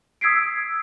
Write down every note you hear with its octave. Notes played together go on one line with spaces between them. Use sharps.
D#6 E6 G#6 B6 C7 D7